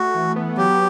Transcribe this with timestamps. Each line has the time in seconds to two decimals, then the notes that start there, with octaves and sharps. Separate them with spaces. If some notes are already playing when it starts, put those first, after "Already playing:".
Already playing: A3 F#4
0.15 E3
0.36 B3
0.57 F#3 G4